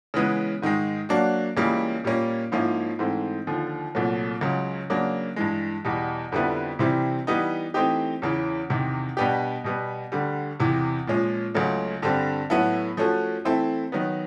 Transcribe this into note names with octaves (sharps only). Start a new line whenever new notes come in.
C#3 E3 G#3 B3
G#2 D#3 G#3
F#3 A#3 D4 F#4
C#2 C#3 E3 G3 A#3
A#2 G3 A#3 C#4
G#2 F3 A#3 C#4 E4
G#2 E3 A3 C4
D#2 D3 F3
C2 A#2 F#3 A3
C#2 C#3 F#3
C#3 F#3 A#3 D4
G2 E3 G#3
E2 B2 G3
F2 D3 G3 B3 E4
C3 E3 G3 C4 E4
E3 G3 B3 D#4
E3 A3 C4 D#4 G4
E2 C#3 E3
E2 C3 D#3
B2 G3 B3 D4 G4
B2 G3 B3
D2 D3 G3
E2 C3 E3
A#2 F3 G#3 C#4
C#2 C#3 F#3 A3
G2 D3 G3 C4
A2 F#3 B3 E4 A4
F3 A3 C#4 F#4 A4
E3 A3 C4 E4 A4
D#3 F#3 B3